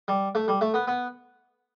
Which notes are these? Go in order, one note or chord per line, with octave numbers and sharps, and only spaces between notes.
G3
A3
G3
A3
B3
B3